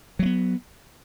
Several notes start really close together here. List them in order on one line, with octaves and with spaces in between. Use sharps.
F#3 A3 B3